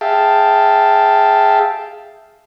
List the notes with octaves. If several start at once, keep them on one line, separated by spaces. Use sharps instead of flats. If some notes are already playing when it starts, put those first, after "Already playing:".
G#4 E5 F5 G5 A5